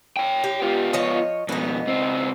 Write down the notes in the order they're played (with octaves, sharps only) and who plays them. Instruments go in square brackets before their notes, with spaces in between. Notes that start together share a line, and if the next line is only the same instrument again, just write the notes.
[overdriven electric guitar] C#5 G5
[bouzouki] G4
[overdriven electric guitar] B3 F4
[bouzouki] F3 C#5 D#5
[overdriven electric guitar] F2 B2 [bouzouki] B3 D#4
[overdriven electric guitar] C#2 C4